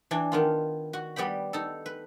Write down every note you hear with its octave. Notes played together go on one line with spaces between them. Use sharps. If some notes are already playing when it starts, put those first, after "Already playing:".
E3 D4 G5 G#5
D#3 B3 F4
F#4
G3 B3 G4 G5 B5
D#4 A4
B4